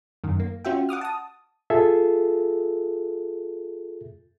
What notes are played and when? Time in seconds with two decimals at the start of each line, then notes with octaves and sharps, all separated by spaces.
0.24 F#2 D#3
0.40 A#3
0.65 C#4 F4 F#4 E5 G5
0.89 F#5 D6 D#6 F6
1.01 A5 D#6
1.70 F4 G#4 A4 E5